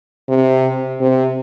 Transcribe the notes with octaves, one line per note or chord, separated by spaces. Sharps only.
C3
C3